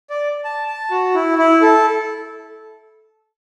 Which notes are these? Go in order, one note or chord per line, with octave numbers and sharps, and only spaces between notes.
D5
A5
A5
F#4
E4
E4
A4